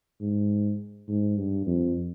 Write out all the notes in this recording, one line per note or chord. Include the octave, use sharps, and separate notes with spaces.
G#2
G#2
G2
F2